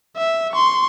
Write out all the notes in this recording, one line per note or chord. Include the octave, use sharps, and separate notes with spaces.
E5
C6 C#6